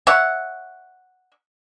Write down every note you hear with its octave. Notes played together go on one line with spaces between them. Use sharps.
C#5 E5 F#5